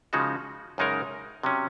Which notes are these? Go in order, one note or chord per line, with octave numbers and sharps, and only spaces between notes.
C#3 F3 G#3 D#4 F#4
F#2 C#3 G#3 D#4 A#4
C3 F#3 C#4